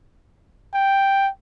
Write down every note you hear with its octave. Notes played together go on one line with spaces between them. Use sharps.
G5